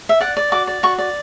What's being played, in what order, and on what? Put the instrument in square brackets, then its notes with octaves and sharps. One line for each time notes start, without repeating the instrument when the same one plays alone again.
[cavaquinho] E5
D5 F#5
D5
F#4 D6
D5
F#4 C#6
D5